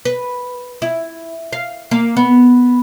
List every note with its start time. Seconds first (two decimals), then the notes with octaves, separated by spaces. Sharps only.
0.05 B4
0.82 E4
1.53 F5
1.91 A#3
2.17 B3